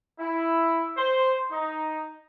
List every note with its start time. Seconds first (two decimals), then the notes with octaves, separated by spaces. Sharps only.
0.20 E4
0.97 C5
1.52 D#4